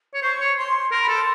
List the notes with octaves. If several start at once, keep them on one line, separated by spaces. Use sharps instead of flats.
C#5
C5 C#6
C#5
C6
A#4 C6
B5
A4 C6